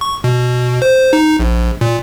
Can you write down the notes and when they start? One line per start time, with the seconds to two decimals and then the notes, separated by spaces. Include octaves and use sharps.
0.01 C#6
0.24 B2
0.82 C5
1.13 D#4
1.40 A#1
1.81 A#2